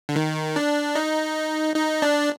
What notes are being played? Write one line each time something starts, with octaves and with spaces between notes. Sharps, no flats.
D3
D#3
D4
D#4
D#4
D4